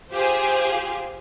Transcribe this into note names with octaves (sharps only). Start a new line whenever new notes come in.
F4 G4 G#4 C5 F5